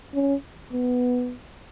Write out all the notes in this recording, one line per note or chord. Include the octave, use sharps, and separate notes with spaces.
C#4
B3